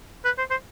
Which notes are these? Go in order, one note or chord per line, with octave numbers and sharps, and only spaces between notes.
B4
C5
C5